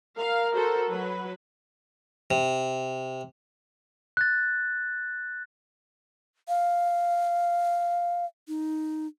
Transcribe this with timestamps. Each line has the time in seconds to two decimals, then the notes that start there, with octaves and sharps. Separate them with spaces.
0.18 A#4 F5
0.53 F#4 A4 C5
0.88 F#3 B4
2.31 C3
4.17 F#6 A6
6.48 F5
8.48 D#4